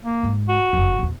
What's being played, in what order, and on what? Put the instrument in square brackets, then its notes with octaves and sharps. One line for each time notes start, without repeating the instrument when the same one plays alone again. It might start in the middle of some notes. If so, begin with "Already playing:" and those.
[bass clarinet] A#3
[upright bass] G#2 G#3
[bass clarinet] F#4
[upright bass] F#1 F2
E2 A#2